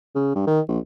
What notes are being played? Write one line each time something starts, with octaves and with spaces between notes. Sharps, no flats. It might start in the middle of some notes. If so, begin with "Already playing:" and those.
C#3
G2
D#3
A#1